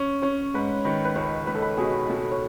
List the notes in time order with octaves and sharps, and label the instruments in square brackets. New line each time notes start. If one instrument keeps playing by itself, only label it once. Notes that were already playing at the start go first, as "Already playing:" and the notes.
Already playing: [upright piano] C#4
[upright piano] C#4 [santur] C#5
[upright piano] G#2 [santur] B4
[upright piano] D#3 [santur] B4
[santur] B4
[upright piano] C#2 [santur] C#5
[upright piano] C#2 [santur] B4
[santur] A4
B4
[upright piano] B2 [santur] G#4
[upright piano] B2 [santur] A4
[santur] C#5